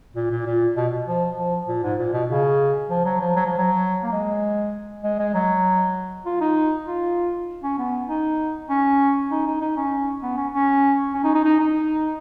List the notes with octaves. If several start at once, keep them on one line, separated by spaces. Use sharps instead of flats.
A#2
A#2
A#2
B2
F3
F3
A#2
G#2
A#2
B2
C#3
F3
F#3
F3
F#3
F3
F#3
A#3
G#3
G#3
G#3
F#3
F4
D#4
F4
C#4
B3
D#4
C#4
D#4
D#4
D#4
C#4
B3
C#4
C#4
C#4
D#4
D#4
D#4
D#4